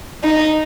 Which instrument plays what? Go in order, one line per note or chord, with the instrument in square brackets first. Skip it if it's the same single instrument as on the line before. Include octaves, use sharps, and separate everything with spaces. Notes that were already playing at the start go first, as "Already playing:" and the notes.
[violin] D#4